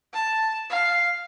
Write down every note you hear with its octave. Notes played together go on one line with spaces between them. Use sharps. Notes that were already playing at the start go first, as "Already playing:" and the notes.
A5
F5